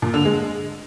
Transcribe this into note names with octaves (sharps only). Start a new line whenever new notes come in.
A#2
D3
G#3